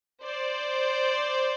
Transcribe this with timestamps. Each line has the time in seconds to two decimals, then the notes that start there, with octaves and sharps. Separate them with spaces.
0.23 C5 D5